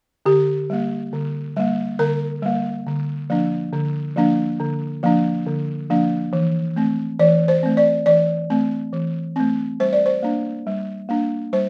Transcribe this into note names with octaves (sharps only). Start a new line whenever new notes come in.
D3 G4
G3 A#3
D3
G3 A#3
D3 A#4
G3 A#3
D3
F3 A#3 D4
D3
F3 A#3 D4
D3
F3 A#3 D4
D3
F3 A#3 D4
E3
A3 C4
E3 D5
C5
A3 C4
D5
E3 D5
A3 C4
E3
A3 C4
G3 C5
D5
C5
A#3 D4
G3
A#3 D4
G3 C5